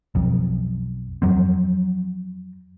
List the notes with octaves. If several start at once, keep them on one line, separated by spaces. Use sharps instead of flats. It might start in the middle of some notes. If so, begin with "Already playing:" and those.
B1 F2
F2 F#3 C4